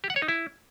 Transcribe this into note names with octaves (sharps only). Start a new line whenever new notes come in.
G4
F#5
C#5
D#4
E4